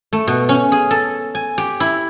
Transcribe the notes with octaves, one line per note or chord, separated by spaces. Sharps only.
A3
B2
C#4
G#4
A4
G#5
G4
E4